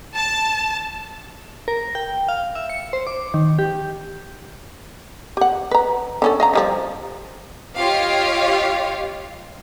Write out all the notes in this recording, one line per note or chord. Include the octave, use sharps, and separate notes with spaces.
A5
A#4
G5
F5
E5
C#7
C5
D6
D#3
G4
G4 F#5
B4 A#5
D3 C#4 A4
D#5 F5 A#5
F3 G3 D#4
F4 G4 C#5 D#5 F5